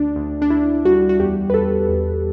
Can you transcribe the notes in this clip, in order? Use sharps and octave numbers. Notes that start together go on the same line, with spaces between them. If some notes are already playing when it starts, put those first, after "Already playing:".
Already playing: D2 D4
D2
D4
D2 E4
G3 F#4
F#4
E2 G4
B4
E2 A4
E2